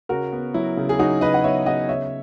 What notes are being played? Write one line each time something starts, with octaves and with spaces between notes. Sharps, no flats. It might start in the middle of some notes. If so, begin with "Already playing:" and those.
C#3 F#4 A#4
B3
F#3 E4
C#3
G#4
F#3 D#4 F#4
C#3 B4 D#5
F#5
B3 C#5 E5
C#3 D#5 F#5
C#3 C#5 E5